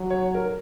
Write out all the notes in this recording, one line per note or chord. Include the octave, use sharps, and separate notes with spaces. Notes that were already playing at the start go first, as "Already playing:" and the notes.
Already playing: F#3
C#5
A#4